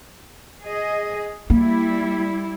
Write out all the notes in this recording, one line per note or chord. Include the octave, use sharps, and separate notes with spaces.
G#4 D#5
G3 A#3 E4